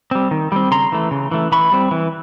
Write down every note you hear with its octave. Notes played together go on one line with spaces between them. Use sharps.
G3 C4
D#3
G3 C4
C#3 A#5 C6
E3 A3
C#3
E3 A3
E3 B5 C#6
G3 C4
E3